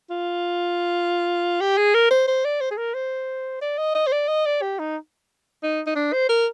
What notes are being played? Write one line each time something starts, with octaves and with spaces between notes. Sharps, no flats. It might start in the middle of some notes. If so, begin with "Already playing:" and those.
F4
G4
G#4
A#4
C5
C5
D5
C5
G#4
A#4
C5
D5
D#5
D#5
C5
D5
D#5
D5
G4
D#4
D#4
D#4
D4
C5
A#4